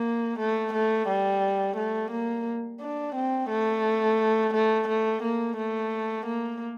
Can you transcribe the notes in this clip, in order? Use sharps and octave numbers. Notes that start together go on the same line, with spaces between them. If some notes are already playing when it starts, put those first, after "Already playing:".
Already playing: A#3
A3
A3
G3
A3
A#3
D4
C4
A3
A3
A3
A#3
A3
A#3